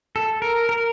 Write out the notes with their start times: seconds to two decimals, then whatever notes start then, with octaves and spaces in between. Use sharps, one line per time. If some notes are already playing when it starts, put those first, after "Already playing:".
0.16 A4
0.42 A#4
0.69 A#4